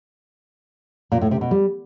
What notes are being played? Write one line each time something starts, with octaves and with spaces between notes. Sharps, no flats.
A#2
A2
C3
B2
G3